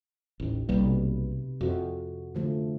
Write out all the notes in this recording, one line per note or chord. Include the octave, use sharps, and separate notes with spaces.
A1 D#2
B1 C3 G3 A#3 B4
F2 C3 F#4
D3 F3 A3